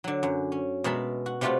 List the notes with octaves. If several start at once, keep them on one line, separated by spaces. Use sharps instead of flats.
D3 F#3
F#2
C#4
B2 G#3 A#4 E5 A5 B5
F#4
C3 G3 A3 F4 F#4 A4